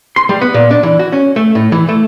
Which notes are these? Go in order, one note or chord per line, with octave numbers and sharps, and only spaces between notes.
C6
G3
B3
A#2
D4
E3
F#4
C#4
A3
A2
E3
A3